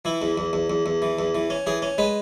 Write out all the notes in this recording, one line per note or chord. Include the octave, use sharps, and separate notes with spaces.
E3 E4
E2
E2
E2
E2
E2
E3
E2
E3
C#4
E3 G#4
C#4
G#3 B4